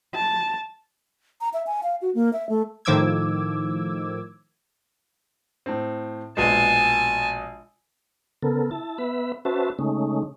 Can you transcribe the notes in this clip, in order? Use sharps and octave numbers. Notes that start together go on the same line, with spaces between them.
A5
A#5
E5
G#5
F5
F#4
A#3
E5
A3
A2 D#3 F3 D6 E6 G#6
A2 C4
A#1 B2 G#3 G#5 A5
C#3 B3 A4 A#4
E4 A5
B3 B4 E5 B5
C#4 F#4 B4 C5 E5 A5
C#3 G#3 A3 C#4 D#4